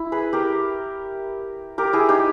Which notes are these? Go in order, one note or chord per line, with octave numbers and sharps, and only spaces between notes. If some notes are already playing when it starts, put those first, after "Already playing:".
Already playing: E4
G#4 B4
G4 A#4
G4 A#4
E4 G#4
D#4 G4